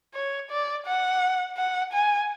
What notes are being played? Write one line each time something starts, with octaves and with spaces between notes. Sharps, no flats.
C#5
D5
F#5
F#5
G#5